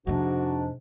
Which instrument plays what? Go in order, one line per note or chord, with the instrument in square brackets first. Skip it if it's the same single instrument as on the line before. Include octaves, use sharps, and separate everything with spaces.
[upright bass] F2 C3 [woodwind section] G#2 D4 [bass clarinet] F#4